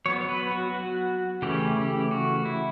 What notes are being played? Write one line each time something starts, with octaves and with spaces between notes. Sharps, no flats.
F#3 B3 C#5
C#5
B4
F#4
F#4
C#3 E3 A3 C#4 G4
G4
F#4
E4